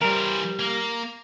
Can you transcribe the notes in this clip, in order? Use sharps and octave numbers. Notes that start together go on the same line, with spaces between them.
E3 G3 A#4 C5
A#3